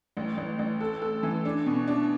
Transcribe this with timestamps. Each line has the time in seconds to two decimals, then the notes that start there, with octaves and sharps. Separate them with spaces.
0.17 A1
0.37 A1
0.59 A1
0.81 A4
1.02 A4
1.23 E3
1.45 D4
1.66 B2
1.88 D4